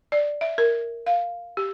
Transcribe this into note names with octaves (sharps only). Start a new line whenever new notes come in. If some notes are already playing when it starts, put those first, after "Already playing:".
D5
E5
A#4
F5
G4